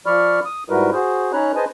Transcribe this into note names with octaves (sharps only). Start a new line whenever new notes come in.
F3 D5 B5 C#6 F6
D#6
G#2 G3 E4 F#4 A#4 B4
F#4 G#4 C5
C#4 D#4 C#5 A#5 B5 F#6
G#4 B4 C5 D#5 G#5 A5